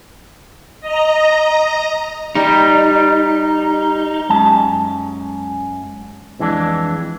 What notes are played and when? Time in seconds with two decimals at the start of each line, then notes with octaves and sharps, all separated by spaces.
0.81 D#5 A#5
2.35 G3 D#4
4.29 F#2 G#3 A5
6.39 F2 E3 G#3 C4 D4